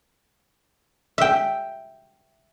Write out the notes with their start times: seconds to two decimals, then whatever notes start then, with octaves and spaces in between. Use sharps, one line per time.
1.18 E5 G5